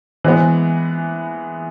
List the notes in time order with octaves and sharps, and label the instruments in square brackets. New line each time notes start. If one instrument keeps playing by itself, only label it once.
[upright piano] E3 G#3 B3